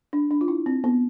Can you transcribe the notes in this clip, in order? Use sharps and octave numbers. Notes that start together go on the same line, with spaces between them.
D4
D4
F4
E4
C4
B3